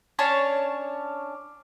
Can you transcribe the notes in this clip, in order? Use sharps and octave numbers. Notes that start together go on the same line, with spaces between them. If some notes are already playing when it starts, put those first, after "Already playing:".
C#4 D4 C#5 A5